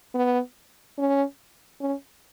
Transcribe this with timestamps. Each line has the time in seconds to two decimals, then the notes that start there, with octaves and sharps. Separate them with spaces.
0.14 B3
0.98 C#4
1.81 C#4